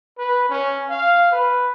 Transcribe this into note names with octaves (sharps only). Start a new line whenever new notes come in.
B4
C#4
F5
B4